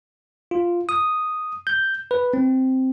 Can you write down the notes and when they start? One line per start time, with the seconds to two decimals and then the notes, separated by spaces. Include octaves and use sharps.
0.51 F4
0.89 D#6
1.67 G6
2.11 B4
2.34 C4